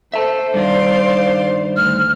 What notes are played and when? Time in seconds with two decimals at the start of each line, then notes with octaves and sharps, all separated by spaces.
0.14 A4 C5 E5 A5
0.54 G2 D#3 G3 D5 F5 C6
1.76 D2 F6